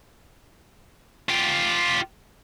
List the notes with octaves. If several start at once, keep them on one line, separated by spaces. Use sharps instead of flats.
F4 G4